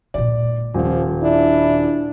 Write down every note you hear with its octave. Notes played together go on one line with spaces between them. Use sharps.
A#2 G#3 D5
D#1 F3
D4 E4